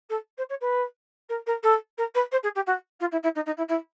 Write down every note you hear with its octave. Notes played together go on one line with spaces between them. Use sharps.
A4
C5
C#5
B4
A#4
A#4
A4
A#4
B4
C5
G#4
G4
F#4
F4
E4
E4
D#4
D#4
E4
E4